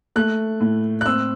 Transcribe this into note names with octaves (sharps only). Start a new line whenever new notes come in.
A3 F#6
A2
F#6
C4 E6